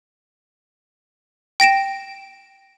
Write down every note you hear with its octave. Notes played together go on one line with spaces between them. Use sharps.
G5 A#6 D7 E7